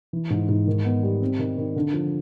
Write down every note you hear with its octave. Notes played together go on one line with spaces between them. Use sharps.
E3
G#2
G#2
D#3
B3
G3
C4
D#3
D#3
D3
F3